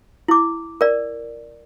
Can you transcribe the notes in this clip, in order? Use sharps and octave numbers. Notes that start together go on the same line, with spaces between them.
E4 D6
A#4 D5